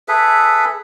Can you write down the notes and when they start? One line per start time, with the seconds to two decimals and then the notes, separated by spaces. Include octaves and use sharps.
0.08 G#4 A4 B4 E5